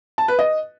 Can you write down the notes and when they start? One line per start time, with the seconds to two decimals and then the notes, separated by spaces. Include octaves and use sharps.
0.18 A5
0.28 B4
0.39 D#5